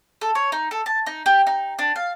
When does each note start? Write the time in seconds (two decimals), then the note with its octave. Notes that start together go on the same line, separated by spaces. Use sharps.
0.21 A4
0.35 C#5
0.52 D#4
0.71 A4
0.86 A5
1.06 D#4
1.26 G4
1.47 D#4
1.79 D4
1.96 F5